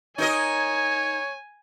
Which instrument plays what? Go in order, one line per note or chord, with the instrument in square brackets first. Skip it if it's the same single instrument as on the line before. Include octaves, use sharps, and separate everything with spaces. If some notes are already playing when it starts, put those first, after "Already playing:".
[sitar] D#4 A#4 D#5 [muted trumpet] C#5 [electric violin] G#5